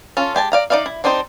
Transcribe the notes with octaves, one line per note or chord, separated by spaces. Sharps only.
C#4 F4 A4
G#3 G4 G#5 A5
D5 F5 A#5
D#4 A4 D5 E5 F5
E4
C4 D4 D#4 G4 C5